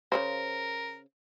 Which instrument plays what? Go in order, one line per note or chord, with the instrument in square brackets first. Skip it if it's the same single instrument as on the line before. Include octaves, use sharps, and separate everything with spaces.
[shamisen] C#3 E3 C5 [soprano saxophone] A#4